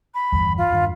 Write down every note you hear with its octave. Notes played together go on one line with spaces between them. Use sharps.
B5
G1 E2 G3
F4
G2 D#3